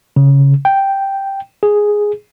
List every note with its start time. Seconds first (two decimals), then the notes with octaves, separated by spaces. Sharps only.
0.16 C#3
0.65 G5
1.63 G#4